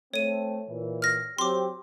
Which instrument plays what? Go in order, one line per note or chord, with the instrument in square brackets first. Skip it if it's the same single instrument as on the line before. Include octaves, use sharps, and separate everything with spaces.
[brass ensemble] A3 C4 [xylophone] C#5 D#7
[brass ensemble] A#2 E3
[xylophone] F6 A#6
[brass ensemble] F#3 C4 G4 [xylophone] C6 D6